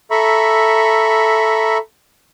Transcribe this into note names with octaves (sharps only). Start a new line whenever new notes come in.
A4 E5 A#5 B5 C#6